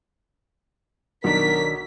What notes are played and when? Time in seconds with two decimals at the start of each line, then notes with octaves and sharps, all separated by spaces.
1.24 B1 D#3 D4 A#4 B6